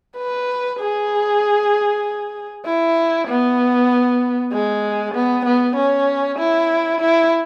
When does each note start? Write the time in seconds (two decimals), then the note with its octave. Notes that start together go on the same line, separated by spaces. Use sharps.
0.16 B4
0.79 G#4
2.65 E4
3.28 B3
4.52 G#3
5.14 B3
5.45 B3
5.75 C#4
6.38 E4
7.01 E4